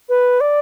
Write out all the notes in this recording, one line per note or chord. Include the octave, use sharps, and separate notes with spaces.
B4
D5